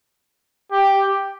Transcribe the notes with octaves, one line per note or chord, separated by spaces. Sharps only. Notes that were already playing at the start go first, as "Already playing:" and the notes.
G4